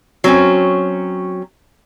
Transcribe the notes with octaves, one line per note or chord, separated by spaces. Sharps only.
F#3 C4 C#4